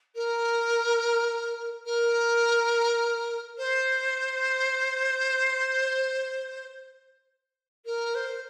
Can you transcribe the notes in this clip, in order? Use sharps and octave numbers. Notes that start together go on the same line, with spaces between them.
A#4
A#4
C5
A#4
C5